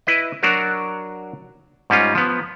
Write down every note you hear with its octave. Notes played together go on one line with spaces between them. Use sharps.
E4 B4 D#5
F#3 D4 F#4 A#4
G#2 G3 C#4 F4
F3 B3